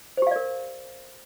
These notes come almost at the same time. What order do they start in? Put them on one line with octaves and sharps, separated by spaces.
C5 G4 F5 D5 A#4